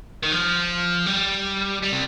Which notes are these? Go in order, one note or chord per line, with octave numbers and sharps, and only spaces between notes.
D#3
F3
G3
G3
C3